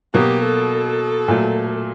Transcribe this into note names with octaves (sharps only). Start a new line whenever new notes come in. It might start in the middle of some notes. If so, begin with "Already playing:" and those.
B2 F#3 A#3 G4
A4
A#2 F#3 A3